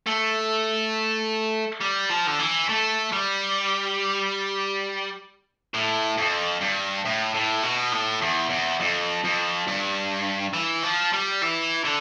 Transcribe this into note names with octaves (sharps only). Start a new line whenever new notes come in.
A3
G3
F3
D3
E3
A3
G3
A2
F2
G2
A2
A2
B2
A2
E2
E2
F2
F2
G2
E3
F3
G3
E3
D3